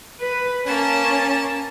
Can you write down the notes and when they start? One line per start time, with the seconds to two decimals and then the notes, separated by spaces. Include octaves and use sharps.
0.20 B4
0.66 A#3 C#4 A5